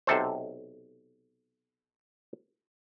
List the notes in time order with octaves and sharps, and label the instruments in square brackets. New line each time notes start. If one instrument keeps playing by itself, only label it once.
[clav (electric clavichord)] B1 C3 A4 C5